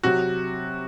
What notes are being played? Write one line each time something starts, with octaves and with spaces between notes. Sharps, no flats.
C3 F#3 F#4